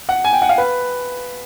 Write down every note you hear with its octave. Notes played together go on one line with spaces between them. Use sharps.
F#5
G#5
G5
F#5
F5
B4